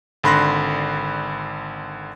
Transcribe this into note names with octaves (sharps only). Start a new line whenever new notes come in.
G#1 D3 B5 C6 F#6 A#6